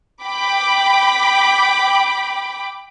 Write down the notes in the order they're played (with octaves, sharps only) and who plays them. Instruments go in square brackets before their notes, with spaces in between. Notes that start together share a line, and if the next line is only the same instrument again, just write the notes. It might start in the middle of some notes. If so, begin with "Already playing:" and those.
[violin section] G5 B5 D6